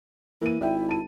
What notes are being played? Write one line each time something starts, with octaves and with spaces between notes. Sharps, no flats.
E3 A#3 A#4 D#7
G#1 E4 D5 E5 G5
A5 D#7